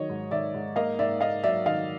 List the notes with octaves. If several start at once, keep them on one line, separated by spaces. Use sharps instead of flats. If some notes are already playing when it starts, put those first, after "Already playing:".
Already playing: D#3 F#3 C#5 D#5
G#2
D#3 D5 E5
G#2
A#3 D#5 F5
G#2 D5 E5
A#3 D#5 F5
F#3 D5 E5
D#3 D#5 F5